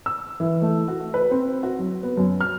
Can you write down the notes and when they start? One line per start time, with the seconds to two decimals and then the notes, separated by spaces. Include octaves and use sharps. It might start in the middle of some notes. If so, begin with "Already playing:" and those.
0.06 E6
0.40 E3
0.62 A3
0.88 F#4
1.14 B4
1.31 C4
1.63 F#4
1.79 F#3
2.03 B3
2.17 F#2
2.41 F6